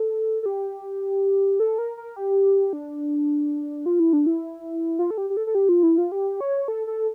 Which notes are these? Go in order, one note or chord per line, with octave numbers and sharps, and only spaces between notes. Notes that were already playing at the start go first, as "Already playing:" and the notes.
Already playing: A4
A4
G4
A4
A#4
A#4
G4
D4
F4
E4
D4
E4
F4
A4
G4
G4
A4
A4
G4
F4
E4
F4
G4
C#5
A4
A4